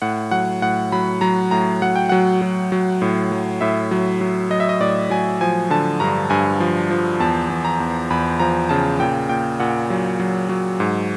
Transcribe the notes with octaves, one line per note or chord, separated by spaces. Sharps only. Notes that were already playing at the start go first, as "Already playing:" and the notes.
A2 F#5
F#3 F#5
A2 F#5
F#3 B5
F#3 A#5
A2 A#5
F#3 F#5
G5
F#3 F#5
F#3
F#3
A2
F#3
A2 E5
F#3
F#3
F#3 D#5
E5
D#5
A2 D5
F#3 G#5
F3 G#5
D3 A5
G2 A#5
G2 G#5
F3
F3
E2 A5
E2
A#5
E2
E2 B5
F3 A#5
C#3 A5
A#2 G5
A#2 G5
A#2 F#5
F#3
F#3
F#3
G#2